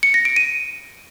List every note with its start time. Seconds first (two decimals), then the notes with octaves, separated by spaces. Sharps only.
0.03 C#7
0.14 A#6
0.25 D7
0.36 D#7